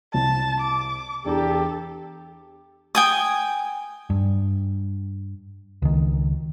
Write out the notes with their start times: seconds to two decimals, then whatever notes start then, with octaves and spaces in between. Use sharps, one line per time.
0.14 C2 A5
0.61 D6
1.26 E2 D4 G4 A4 A#5
2.95 G5 G#5 D#6
4.10 G2
5.82 C#2 D#3